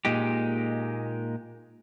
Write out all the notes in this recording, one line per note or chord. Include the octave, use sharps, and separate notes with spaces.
A#2 G#3 D#4 G4